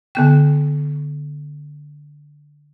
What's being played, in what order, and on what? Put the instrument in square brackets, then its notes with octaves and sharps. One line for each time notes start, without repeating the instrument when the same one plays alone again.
[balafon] D3 B3 G5